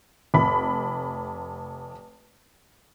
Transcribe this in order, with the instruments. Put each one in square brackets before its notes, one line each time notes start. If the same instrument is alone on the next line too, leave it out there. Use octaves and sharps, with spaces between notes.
[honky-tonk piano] F1 B5